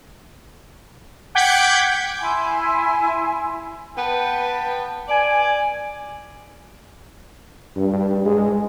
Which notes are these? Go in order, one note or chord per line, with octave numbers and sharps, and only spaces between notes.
F#5 G5 D6 G6 G#6 B6
E4 G#5 C6
B3 B4 G5 A5
D5 G#5
G2
G#3